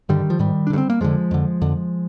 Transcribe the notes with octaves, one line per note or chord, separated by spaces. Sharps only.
G2 D3 D#3 G3
F3
G#2 D#3 G3
D4
G2 D3
C4
A#3
F2 D3 F3 G#3
F2 D3
F2 D3